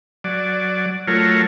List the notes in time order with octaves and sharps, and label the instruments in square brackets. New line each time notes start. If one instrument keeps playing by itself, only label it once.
[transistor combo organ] F#3 D5
F#3 A3 F4 A#4 C#5